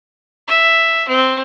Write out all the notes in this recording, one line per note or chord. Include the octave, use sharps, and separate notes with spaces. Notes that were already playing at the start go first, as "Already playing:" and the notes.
E5
C4